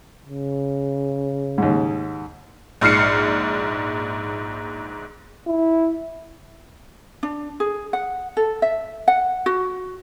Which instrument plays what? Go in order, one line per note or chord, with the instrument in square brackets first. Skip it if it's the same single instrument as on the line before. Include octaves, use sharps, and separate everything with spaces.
[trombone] C#3
[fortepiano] D#2 G#2
[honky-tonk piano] A#1 G#2 F6 C7 C#7
[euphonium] E4
[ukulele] D4
G#4
F#5
A4
E5
F#5
F#4